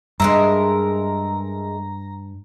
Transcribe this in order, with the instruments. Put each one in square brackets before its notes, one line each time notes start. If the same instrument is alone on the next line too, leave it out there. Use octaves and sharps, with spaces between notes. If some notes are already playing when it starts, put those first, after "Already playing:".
[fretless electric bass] G2 [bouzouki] G#3 A#4 E5 [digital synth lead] A#5